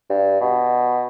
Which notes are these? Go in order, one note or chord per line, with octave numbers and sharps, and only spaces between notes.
G2
B2